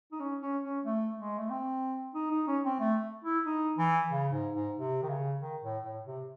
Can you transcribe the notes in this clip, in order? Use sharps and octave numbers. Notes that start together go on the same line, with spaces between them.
D#4
C#4
C#4
C#4
A3
G#3
A3
C4
D#4
D#4
C#4
C4
A3
E4
D#4
E3
C#3
G#2
G#2
C3
D#3
C#3
D#3
A2
A2
C3